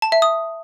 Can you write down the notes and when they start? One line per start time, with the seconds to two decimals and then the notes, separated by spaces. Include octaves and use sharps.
0.02 A5
0.12 E5
0.22 D#6